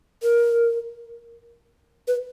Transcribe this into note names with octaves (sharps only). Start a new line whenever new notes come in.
A#4
B4